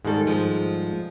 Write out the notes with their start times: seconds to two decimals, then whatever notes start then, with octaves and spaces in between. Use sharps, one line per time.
0.05 G#2 D#3 G3 G#3 A4
0.27 F3 G#3